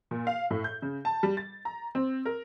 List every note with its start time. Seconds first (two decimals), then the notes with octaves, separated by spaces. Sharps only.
0.11 A#2
0.27 F5
0.50 A2
0.64 G6
0.82 C#3
1.05 A5
1.23 G3
1.37 A6
1.65 A#5
1.95 C4
2.25 A#4